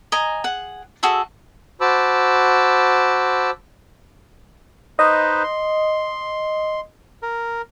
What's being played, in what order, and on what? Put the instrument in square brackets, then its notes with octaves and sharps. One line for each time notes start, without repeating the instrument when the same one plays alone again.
[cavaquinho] D#5 G#5 A#5
G#4 F#5
F#4 G#4 A4 E5
[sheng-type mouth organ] F#4 C5 A5 B5 D6 E6
[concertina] D#4 B4 C5 [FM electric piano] D#5
[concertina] C6
A#4